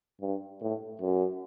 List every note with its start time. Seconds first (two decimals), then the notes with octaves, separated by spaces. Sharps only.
0.21 G2
0.61 A2
1.02 F#2